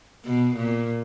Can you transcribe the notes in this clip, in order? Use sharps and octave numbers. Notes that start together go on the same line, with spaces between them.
B2
A#2